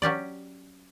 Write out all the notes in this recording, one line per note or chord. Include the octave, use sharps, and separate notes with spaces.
F#3 C#4 G4 D5